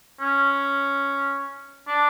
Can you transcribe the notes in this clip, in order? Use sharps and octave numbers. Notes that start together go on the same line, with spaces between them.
C#4
D4